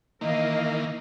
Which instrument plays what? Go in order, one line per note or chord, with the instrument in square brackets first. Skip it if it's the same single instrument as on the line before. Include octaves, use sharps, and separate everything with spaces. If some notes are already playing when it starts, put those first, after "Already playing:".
[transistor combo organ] D#3 E3 A#3 [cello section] A#4 D#5 F5